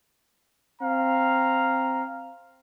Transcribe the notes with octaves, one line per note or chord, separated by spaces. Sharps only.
C4 F5 A#5